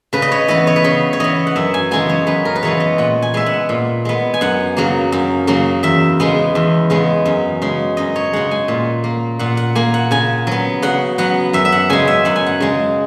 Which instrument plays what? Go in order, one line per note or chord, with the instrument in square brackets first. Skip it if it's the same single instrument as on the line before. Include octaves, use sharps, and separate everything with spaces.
[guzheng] C#3 B4
D#5
C#5
E3 B3 D#5
C#5
B4
C#3 C#5
C#5
E3 B3 D#5
F#5
F#2 E5
G#5
C#3 E3 G#3 B3 G#5
C#5
F#2 B4
A#4
B4
C#3 E3 G#3 B3 C#5
D#5
A#2 F#5
G#5
G#3 B3 E5
F#5
A#2
G#3 B3
G#5
F#2 F#5
C#3 F#3 A#3
F#2
C#3 F#3 A#3
E2 E5
C#3 G#3 B3
E2
C#3 G#3 B3
F#2
C#3 G#3
F#2 D#5
C#5
C#3 G#3 F#5
G#5
A#2
A#3
A#2 F#5
F#5
A#3 G#5
F#5
C#3 G#5
F#3 B3
C#3 F#5
F#3 B3 F#5
F#2 E5
E5
F#5
C#3 G#3 G#5
E5
F#2 F#5
G#5
F#5
C#3 G#3